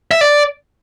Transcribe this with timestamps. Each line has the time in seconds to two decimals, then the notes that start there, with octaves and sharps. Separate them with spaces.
0.11 E5
0.21 D5